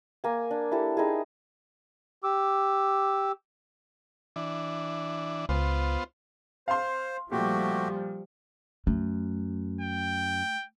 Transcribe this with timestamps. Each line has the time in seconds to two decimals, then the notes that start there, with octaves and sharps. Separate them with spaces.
0.24 A#3 G#5
0.51 D4
0.72 E4 G4 A4
0.97 D#4 E4 G#4
2.24 G4 D6 E6
4.36 E3 D4
5.49 C#2 B3 F4 C5
6.68 C5 F5 C6
7.32 A#2 F3 G3 A3 F#4 G4
8.87 F#2 A3
9.81 G5